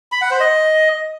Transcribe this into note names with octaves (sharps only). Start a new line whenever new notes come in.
B5
F#5
C5
D#5